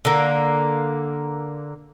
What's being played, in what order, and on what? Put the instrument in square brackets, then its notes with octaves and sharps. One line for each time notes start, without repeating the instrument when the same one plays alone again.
[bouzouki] D3 A#3